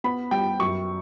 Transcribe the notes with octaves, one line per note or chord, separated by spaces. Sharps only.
B3 B5
G3 G5
F#2 C#6